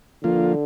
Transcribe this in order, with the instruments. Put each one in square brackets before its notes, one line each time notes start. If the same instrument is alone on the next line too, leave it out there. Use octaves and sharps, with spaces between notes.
[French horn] D3 [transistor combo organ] F3 A#3 F4